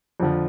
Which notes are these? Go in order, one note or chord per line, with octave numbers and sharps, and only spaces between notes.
F2 D3 F3